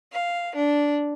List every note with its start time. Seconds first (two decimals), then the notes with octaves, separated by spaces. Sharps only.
0.11 F5
0.54 D4